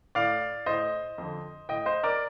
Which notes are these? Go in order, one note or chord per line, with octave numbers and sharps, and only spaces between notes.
A2 D5 F5
A2 C5 D#5
F2 D3
A2 D#5 G5
C5 D#5
A#4 D5